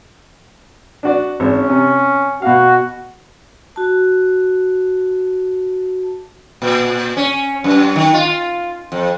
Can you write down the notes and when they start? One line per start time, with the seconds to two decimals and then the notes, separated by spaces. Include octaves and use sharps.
1.03 D4 F#4 D5
1.40 G#1 C#4
1.69 C3
2.42 B2 F#4 F5
3.76 F#4 A5
6.62 A#2
7.17 C#4
7.64 F#2
7.96 D#3
8.14 F4
8.92 F2